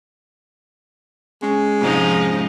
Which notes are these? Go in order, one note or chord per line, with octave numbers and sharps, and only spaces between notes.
G#3 C#4
F2 G#2 C3 F3 D#4